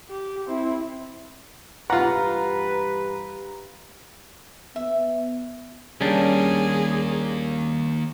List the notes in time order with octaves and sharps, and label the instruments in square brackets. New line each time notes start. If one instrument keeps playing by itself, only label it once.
[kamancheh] G4
C4 E4
[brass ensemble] G2 E3 G4 [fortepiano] F4 F#5 [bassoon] B4 [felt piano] A#5
[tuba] B3 [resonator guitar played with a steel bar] E5
[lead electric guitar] D#3 A#3 [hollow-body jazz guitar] G3 [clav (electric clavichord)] C#4 D4 [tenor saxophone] G#4